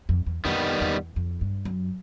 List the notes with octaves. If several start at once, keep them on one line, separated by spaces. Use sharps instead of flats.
F2
E2
F2 D#3 G3 B3
E2
F2
G2
F#2